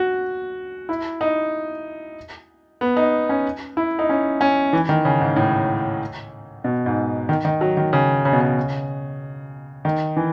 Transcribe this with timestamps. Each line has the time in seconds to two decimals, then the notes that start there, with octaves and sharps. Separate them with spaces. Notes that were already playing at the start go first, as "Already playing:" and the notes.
Already playing: F#4
0.89 E4
1.21 D#4
2.81 B3
2.97 D#4
3.29 C#4
3.77 E4
3.99 D#4
4.09 C#4
4.41 C#4
4.73 E3
4.89 D#3
5.05 C#3
5.20 G#2
5.36 A2
6.64 B2
6.86 G#2
7.29 D#3
7.45 D#3
7.61 F#3
7.77 D#3
7.93 C#3
8.25 C#3
8.33 B2
8.41 C#3
9.85 D#3
10.16 E3